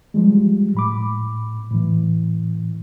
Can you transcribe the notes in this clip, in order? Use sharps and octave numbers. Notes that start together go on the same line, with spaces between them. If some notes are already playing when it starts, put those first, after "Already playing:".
F3 G3 G#3
A2 B5 D6
A2 E3